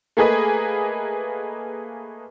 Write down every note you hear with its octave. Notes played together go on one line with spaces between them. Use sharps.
A3 A#3 G#4 B4 D#5